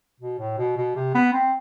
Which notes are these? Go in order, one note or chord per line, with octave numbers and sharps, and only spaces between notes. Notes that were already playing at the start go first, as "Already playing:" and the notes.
B2
A2
B2
B2
C3
B3
C4